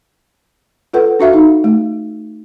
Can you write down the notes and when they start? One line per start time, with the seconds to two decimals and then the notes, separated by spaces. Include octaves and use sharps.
0.93 F4 A4 B4 F#5
1.19 D4 F#4 E5 F5
1.33 D#4
1.64 A3